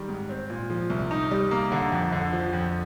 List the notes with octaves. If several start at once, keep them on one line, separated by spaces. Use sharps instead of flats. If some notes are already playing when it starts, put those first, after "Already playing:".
Already playing: D#3 G3
G#2
C4
A#2
F3
C2
D#4
G3
A#3
D3
F2
D3
F3
F2